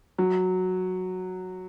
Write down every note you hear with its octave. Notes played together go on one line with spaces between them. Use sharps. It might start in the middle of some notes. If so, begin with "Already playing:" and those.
F#3